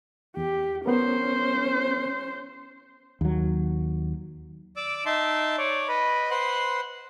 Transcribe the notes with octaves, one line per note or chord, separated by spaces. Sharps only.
E2 G4
B3 C#4 A#4 C5
D#2 F#3
D5 D6 E6
D#4 E5 A5 C6
C#5 D5
B4 D#5 B5
B4 C5 F#5 C6 F#6